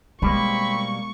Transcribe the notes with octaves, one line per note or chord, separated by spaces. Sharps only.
B2 G3 G#3 A#3 C4 B5 C#6